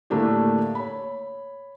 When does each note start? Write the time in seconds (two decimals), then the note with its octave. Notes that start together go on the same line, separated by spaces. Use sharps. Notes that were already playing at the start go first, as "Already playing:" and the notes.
0.10 A2 D3 A3 A#3 D4 G4
0.75 C#5 B5